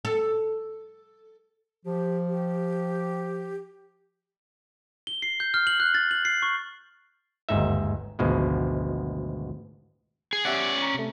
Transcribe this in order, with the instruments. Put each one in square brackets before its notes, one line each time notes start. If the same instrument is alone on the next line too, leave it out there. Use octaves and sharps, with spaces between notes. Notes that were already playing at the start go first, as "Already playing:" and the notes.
[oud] A4
[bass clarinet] F3 [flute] G4
[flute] G4
[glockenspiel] G7
C7
G6
F6
F#7
F#6
A6
F#7
C7
C#6
[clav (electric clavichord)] G1 D#2 G#2 D#4 E5
G#1 D2 B2 F3 G#3
[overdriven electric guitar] G#4
[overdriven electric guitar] C#4 D5 [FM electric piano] G4 E5 F#5
[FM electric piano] A#5 C#6
C3 A3